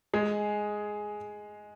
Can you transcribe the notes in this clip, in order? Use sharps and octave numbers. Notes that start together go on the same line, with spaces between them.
G#3 G#4